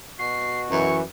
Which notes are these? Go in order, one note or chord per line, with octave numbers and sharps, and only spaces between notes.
B2 F#4 C7
F#2 E3 C#6